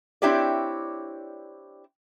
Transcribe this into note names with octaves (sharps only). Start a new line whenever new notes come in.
C4 D4 E4 G4 C#5 D5